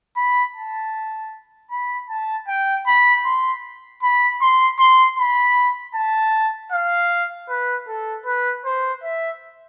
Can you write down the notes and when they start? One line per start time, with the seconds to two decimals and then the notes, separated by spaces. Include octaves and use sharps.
0.17 B5
0.56 A5
1.71 B5
2.10 A5
2.48 G5
2.87 B5
3.25 C6
4.02 B5
4.41 C6
4.79 C6
5.18 B5
5.95 A5
6.72 F5
7.49 B4
7.88 A4
8.26 B4
8.65 C5
9.03 E5